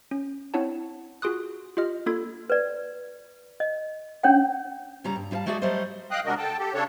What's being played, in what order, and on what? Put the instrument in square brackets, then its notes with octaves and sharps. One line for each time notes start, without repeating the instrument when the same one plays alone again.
[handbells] C#4
C4 D4 E4 C#5 F#5 A5
F4 F#4 G#4 C6 D#6 F#6
F4 G4 D#5 F6
A#3 D4 F4 A4 B5 G#6
[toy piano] B4 D5
D#5
C#4 D4 C#5 F#5 G5
[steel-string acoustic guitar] C#3 G3 C#4 A#5
G2
G3 D#4 B4 F5 A5
G#3 A3 F#4 G#4 A4 D5
F#3 G3 A3 A4 C5 D#5
[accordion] D#5 F5 G5 D#6 F#6
C3 G#3 D4 F#4 A#4 D#5
A4 G5 A5
G4 A4
C#3 D4 A4 C#5